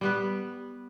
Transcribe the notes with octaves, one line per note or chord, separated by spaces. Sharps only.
G3 B3 B4